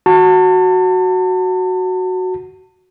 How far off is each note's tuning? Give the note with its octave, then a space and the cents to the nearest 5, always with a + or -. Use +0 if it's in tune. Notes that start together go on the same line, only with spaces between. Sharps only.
F#4 +0 A5 +35